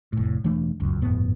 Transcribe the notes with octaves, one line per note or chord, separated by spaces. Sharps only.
F1 A2
E1 E3 A3 D4
E1 C#2 F#2
G1 F2 A2 B3